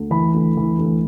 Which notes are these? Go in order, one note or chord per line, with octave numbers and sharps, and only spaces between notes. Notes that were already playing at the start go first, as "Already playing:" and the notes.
Already playing: D2
E3 B5
D2
E3
D2